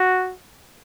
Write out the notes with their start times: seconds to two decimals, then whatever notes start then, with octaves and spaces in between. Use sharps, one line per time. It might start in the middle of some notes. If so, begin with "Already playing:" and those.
Already playing: F#4